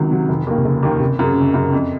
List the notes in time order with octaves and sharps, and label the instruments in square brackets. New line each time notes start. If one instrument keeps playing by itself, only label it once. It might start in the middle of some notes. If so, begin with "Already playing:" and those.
Already playing: [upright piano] C#2 C3 F#3 [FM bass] D#3
[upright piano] C3 F#3
F1
D#2 D#3 A#3
[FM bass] C3
[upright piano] F1 [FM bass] C#3
[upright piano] D#2 D#3 A#3
[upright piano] F#1 [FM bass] C3
[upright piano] F#2 C#3
F#1
F#2 C#3
F2